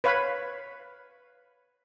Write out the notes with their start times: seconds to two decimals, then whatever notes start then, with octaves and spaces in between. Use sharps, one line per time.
0.04 B4 C#5 F5 B5